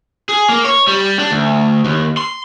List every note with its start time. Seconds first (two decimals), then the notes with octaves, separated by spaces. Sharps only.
0.29 G#4
0.49 A#3
0.64 C#5
0.87 G3
1.19 D4
1.31 D2
1.85 D#2
2.17 C6